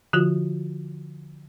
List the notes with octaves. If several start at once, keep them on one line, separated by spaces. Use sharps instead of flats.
D3 F3 F4 F#4